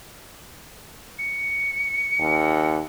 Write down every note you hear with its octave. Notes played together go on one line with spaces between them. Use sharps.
C#7
D#2